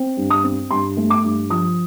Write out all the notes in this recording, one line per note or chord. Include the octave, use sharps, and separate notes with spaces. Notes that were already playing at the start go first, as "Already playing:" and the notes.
Already playing: C4
G2
D#6
C4
G2 C6
A3
D6
G2
F3 D#6